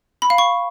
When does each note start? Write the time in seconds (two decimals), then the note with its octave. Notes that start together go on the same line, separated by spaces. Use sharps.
0.22 B5
0.30 F5
0.38 C#6